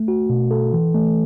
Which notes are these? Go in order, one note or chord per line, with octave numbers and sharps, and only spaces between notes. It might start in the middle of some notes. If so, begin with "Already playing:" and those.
Already playing: A3
F#4
B2
A4
E3
A3